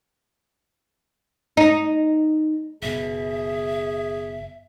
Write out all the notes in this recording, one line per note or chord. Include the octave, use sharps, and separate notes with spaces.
D#4
F#1 B2 G#4 E5